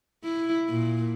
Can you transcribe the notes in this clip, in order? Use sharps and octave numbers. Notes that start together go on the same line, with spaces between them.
E4
A#2